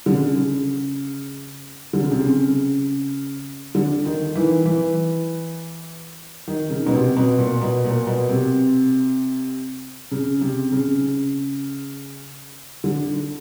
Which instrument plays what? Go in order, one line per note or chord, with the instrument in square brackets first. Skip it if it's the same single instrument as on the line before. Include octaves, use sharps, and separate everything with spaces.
[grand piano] D3
C#3
D3
C#3
C3
C#3
D3
D#3
E3
E3
D#3
C#3
B2
C3
B2
A#2
B2
A#2
B2
C3
C#3
C3
C#3
D3